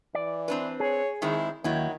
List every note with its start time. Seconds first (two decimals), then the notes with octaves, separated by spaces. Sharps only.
0.15 E3 D5
0.48 C4 D4 B4
0.80 G#4 C#5
1.22 D#3 G#3 C4 E4
1.64 D#2 D#3 F#3 E4